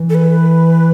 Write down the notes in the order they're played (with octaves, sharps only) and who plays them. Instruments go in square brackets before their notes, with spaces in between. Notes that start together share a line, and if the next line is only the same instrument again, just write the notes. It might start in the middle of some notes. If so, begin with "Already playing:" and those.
Already playing: [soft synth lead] E3
[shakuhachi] A4
B4